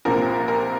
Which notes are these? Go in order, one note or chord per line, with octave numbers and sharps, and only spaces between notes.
C2 A#2 F3 A#4
A#4